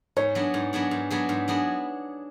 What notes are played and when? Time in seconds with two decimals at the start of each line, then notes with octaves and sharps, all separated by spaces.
0.17 G#2 C#5
0.35 F#3 B3 D4 G#4
0.54 G#2
0.73 F#3 B3 D4 G#4
0.91 G#2
1.10 F#3 B3 D4 G#4
1.29 G#2
1.48 F#3 B3 D4 G#4